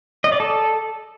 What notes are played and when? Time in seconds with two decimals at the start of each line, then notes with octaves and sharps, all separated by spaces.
0.24 D#5
0.32 D5
0.40 A4